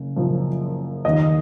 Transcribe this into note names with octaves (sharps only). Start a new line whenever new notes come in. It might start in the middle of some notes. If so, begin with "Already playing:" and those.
Already playing: F#1 C#3
F#1 F#2 C#3 F3
D#2 D#3 D#5